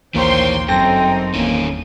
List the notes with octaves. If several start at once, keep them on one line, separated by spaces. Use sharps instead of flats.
A#1 D#2 E3 A#3 C5 C#5 G5 C6
G1 F#2 C4 D#4 A4 G5 A#6
G1 E2 D#3 A#3 C#4 D#7